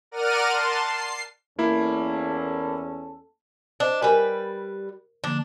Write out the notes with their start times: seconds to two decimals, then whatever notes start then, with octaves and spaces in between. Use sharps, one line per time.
0.11 A#4 D5 F#5 F6 D#7
0.48 A5 C6
0.81 C7
1.59 E2 A#3 C#4 E4 A4
3.80 D4 C5 D#5 A5
4.02 G3 A#4 B4 G#5
5.24 D3 F3 A#3 D4